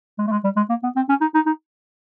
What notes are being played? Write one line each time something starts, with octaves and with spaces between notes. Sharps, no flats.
G#3
A3
G#3
G3
G#3
A#3
B3
C4
C#4
D#4
D#4
D#4